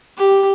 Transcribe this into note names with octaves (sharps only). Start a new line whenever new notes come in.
G4